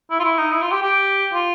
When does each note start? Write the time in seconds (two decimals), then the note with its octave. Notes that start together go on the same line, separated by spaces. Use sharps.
0.11 E4
0.19 F4
0.24 E4
0.38 D#4
0.51 E4
0.62 F4
0.72 G4
0.82 G4
1.33 F4